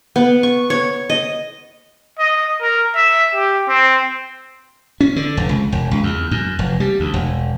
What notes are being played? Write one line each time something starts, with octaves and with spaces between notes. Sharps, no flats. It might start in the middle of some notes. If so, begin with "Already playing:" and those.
B3
C#6
C#5
D#5
D#5
A#4
E5
G4
C4
C#4
D3
F1
C#2
E1
C#2
E2
F#2
F1
G3
D2
E1